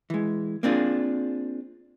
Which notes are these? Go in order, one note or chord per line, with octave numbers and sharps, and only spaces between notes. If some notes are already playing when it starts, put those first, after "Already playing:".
E3 G#3
A#3 C4 D4 F4 G#4